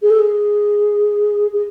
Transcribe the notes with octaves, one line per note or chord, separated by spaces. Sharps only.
G#4
A4
G#4
G#4